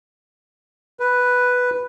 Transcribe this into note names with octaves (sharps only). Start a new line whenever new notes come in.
B4